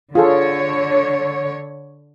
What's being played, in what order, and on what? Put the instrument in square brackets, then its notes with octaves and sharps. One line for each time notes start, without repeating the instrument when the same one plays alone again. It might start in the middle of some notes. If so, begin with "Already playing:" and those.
[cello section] D3 C#5 [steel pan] F4 G#4 A4